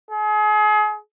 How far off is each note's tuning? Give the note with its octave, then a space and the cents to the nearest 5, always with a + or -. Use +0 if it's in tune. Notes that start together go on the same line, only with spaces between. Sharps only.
G#4 +35